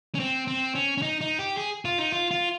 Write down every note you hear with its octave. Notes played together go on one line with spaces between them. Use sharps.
C#4
C4
C4
C#4
C#4
D#4
D#4
G4
G#4
F4
D#4
F4
F4